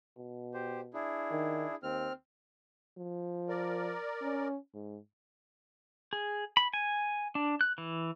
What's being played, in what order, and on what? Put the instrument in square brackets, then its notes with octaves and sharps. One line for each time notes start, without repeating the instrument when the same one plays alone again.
[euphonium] B2
[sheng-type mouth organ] G4 C5
D4 E4 G#4
[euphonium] D#3
[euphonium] D#2 [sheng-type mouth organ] C4 F6
[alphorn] F3
[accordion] A#4 D5
[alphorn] C#4
G#2
[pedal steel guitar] G#4
B5
G#5
D4
F#6
E3